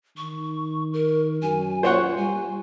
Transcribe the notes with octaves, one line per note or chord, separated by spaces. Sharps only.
D#3 C#6
A#4
F#2 G#5
F4 C5 C#5 F#5
G3 G#5